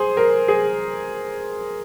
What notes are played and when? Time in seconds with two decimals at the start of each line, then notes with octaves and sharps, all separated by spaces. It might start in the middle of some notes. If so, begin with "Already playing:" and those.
Already playing: G#4 C5
0.17 A#4
0.48 G#4